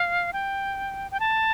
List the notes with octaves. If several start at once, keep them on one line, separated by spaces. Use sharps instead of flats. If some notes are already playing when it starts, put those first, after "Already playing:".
Already playing: F5
G5
G5
A5